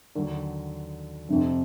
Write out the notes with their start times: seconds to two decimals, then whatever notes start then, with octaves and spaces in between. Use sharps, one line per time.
0.15 D#2 D3 F#3
1.29 F2 C3 F3